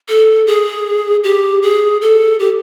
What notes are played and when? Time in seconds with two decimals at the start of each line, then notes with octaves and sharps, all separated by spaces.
0.09 A4
0.47 G#4
1.24 G4
1.62 G#4
2.01 A4
2.40 G4